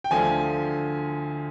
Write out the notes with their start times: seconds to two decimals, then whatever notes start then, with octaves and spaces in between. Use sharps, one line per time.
0.04 G5
0.11 D2 D3 F3 G#5